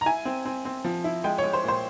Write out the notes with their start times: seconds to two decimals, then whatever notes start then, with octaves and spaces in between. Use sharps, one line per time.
0.01 A#5
0.06 E4 G#5
0.25 C4
0.45 C4
0.65 C4
0.85 F3
1.04 E4
1.24 G#3 G5
1.38 C#5
1.43 G#3
1.53 C5
1.64 A#2 C5